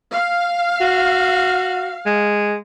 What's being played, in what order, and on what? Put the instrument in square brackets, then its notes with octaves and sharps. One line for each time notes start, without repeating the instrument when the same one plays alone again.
[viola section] F5
[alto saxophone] F#4
G#3